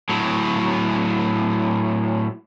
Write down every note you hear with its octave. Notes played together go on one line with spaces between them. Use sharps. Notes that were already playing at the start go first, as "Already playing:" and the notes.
A2 F#3